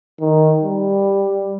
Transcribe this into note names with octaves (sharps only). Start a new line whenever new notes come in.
D#3
G3